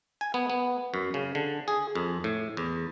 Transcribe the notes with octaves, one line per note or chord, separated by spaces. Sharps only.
G#5
B3
B3
F#2
C#3
D3
G#4
F2
A2
E2